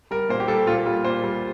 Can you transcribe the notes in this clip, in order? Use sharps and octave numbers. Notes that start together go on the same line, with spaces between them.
G3 A#4
A#2 C5
G4
G3 A4
A#2 F4
G3 F4
A#2 C5
G3